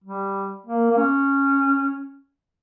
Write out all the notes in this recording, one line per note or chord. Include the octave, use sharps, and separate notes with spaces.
G3
A#3
A#3
C#4